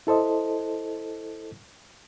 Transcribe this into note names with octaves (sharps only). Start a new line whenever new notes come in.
E4 A4 C5 D#5